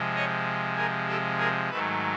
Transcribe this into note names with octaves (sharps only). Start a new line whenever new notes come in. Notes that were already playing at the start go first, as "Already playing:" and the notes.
Already playing: C3 F3 G#3
C#5 D#5
G#4 A#4
G4 A4
G#4 A#4
G#2 D#3 F#3 A3 A4 B4